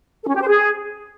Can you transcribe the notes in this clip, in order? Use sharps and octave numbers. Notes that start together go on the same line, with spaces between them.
A4
C#4
G4
C5
G#4